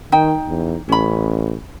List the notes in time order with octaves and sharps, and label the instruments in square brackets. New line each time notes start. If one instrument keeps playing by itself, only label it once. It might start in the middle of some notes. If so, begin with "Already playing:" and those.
[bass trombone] D#3 [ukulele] D#4 G5
[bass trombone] E2
[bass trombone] A1 [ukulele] C#4 B5